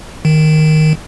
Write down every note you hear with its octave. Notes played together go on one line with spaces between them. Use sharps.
D#3